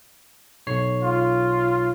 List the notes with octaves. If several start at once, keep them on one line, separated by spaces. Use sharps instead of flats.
B1 C#5 C7
F4